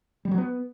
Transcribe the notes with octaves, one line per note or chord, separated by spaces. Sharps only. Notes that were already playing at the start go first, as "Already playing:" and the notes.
G3
F#3
B3